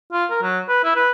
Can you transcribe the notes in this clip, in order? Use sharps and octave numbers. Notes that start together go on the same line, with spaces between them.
F4
A#4
F#3
B4
E4
B4